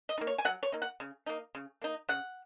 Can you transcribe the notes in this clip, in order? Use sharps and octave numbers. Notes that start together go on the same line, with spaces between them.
D#5
A#3 D#4
C#5
G#5
F#3 F#5
C#5
A#3 D#4
F#5
C#3
A#3 D#4
C#3
A#3 D#4
C#3 F#5